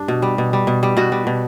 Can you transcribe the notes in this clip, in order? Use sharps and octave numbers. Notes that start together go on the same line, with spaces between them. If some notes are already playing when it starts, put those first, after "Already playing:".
Already playing: G2 D4
B2
G3
B2
G3
B2
G3
B2 F#4
G3
B2